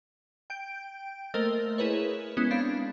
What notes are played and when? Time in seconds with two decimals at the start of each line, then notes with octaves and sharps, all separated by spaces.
0.50 G5 G6 D7
1.34 A3 A#3 A#4 C5 D#5
1.78 E4 G#4 A#4 B4 C#5
2.37 G#3 B3 C#4 E4
2.50 C4 D4 F5 B5